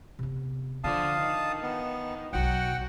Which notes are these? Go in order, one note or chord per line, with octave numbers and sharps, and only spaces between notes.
C3 B3
D3 F3 D4 F5 A5 D#6
D#3
B3
B1 E2 F#3 F#4 F#5 G5